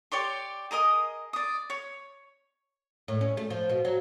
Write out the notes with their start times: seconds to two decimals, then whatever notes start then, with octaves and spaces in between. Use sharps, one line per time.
0.12 G4 C#5 D5 C6
0.71 G#4 A#4 D#5 D#6
1.33 D5 D#6
1.70 C#5
3.08 A2
3.21 C#4
3.37 A3
3.50 F3
3.69 B2
3.85 F#3